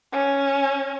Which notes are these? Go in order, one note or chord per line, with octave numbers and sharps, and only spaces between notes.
C#4